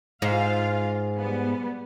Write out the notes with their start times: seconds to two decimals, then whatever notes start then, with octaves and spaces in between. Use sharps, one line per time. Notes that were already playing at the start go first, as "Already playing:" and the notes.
0.22 G#2 F4 F5
1.16 G3 B3